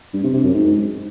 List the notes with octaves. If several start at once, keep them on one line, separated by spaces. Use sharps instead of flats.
G2
C3
C3
F#2
G#2